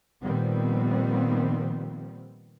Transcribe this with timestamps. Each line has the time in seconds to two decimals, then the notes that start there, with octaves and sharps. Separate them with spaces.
0.23 A#2 D#3 F3 G3 B3 C4